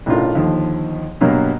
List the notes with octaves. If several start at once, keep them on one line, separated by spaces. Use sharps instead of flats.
B1 A2 C#3 D4 F4 A#4
D#2 D3 F3
G2 B2 F#3 A#3